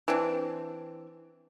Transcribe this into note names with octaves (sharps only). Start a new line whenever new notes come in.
E3 C4 D4